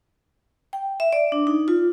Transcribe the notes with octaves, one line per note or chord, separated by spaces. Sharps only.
G5
E5
D5
D4
D#4
F4